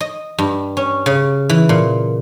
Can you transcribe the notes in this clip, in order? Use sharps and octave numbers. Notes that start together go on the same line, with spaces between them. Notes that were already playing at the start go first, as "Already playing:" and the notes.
D#5
G2
C#4
C#3
E3
A#2